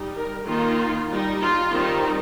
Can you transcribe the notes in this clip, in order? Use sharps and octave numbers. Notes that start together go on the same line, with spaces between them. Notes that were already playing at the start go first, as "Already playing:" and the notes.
Already playing: G3 D#4
A#4
D#3 A#3 D#4 F4
G3 D#4
F4
D#3 G3 C4 D#4